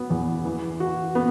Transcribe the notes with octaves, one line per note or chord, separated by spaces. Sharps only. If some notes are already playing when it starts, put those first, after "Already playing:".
Already playing: F#3 B3
E2
E3
F#4
B3